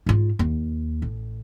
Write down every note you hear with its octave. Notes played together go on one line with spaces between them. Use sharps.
G#2 F4
D#2
A1